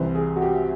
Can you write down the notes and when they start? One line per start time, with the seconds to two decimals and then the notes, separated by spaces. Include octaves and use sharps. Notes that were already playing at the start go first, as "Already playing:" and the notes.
Already playing: C2 C3 E3 C5
0.15 G#4
0.36 F#4
0.42 G4